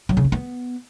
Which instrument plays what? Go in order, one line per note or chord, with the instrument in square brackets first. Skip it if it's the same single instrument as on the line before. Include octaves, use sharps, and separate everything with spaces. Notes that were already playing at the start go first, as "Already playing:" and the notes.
[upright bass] F#3
C#3
C#4
B3